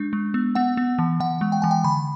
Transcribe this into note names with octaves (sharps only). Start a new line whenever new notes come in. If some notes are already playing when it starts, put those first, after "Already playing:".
Already playing: G#3 D4
G#3
B3
B3 F#5
B3
E3
E3 F#5
G#3
G5
E3 G#5
G5
D3 B5